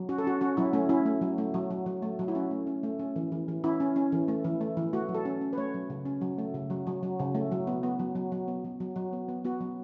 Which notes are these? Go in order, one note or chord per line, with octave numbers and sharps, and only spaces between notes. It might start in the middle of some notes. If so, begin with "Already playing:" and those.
Already playing: F#3
C#4 F#4
A4
C#4 F#4
C#4 F#4
F#3 E4
A3 C#4
C#4 E4
A3
F#3
A3
F#3
F#3
F#3
A3
F#3
E4
C#4 F#4
A3
C#4
A3
C#4
E3
E3
E3
C#4 E4
C#4
C#4
E3
A3
E3
A3
E3
A3 F#4
F#3
A4
C#4
C#4
B4
A3 C#5
F#3
C#3
C#4
F#3
A3
C#3
F#3
F#3
F#3
C#3
A3
F#3
B3
B3
F#3
F#3
F#3
B3
F#3
F#3
F#3
B3
B3
B3 F#4
F#3